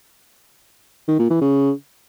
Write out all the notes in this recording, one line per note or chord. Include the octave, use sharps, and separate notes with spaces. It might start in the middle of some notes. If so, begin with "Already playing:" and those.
D#3
A#2
E3
C#3